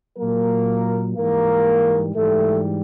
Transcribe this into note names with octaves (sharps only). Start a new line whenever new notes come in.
A#2 F#3 A#3 A#4
G#2 E3 G3 A#3 A#4
G#2 E3 G3 A3 A4